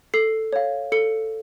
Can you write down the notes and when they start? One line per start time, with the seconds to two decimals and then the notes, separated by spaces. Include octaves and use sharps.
0.14 A4 C7
0.53 C#5 F5
0.92 A4 C#7